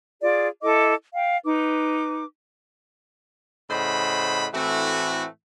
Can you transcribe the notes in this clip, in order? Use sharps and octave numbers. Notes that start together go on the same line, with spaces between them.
F4 G#4 D5
E4 A4 D#5 D6
F5 G5
D#4 B4 D6
A2 C#3 C5 D#5 F#5 B5
A2 E3 A3 C4 F#4